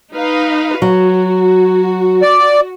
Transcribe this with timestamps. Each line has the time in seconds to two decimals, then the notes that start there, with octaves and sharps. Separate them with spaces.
0.14 D#4 B4 F5
0.82 F#3 F#4
2.22 D5